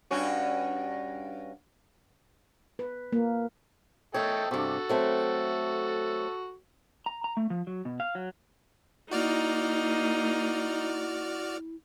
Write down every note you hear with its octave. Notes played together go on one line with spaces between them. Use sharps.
G2 C#4 F#4
B4
A#3
A3 A4 C#5 D#5 G5
G2 C3 F#4 A4
F#3 A3 C4
A#5
A#5
A3
F3
F#3
B2
F5
F#3
A#3 D#4 E4 F#4 D5 F6